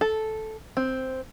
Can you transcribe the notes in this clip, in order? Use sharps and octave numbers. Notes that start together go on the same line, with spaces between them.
A4
C4